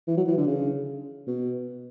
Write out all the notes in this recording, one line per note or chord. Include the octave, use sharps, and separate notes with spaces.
E3
F#3
E3
D3
C#3
B2